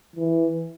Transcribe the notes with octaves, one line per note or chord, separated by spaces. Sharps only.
E3